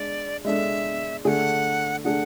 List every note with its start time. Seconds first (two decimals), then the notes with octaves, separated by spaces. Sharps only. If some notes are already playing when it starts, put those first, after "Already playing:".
Already playing: G#3 D4 D5
0.45 G#3 D4 A4 E5
1.25 D3 A3 D4 G#4 F#5 G#5
2.04 D3 A3 D4 G#4 F#5